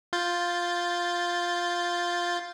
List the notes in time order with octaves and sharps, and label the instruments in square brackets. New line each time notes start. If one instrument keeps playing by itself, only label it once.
[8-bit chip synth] F4 G6 A6